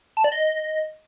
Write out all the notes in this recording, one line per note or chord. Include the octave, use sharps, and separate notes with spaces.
A5
D5
D#5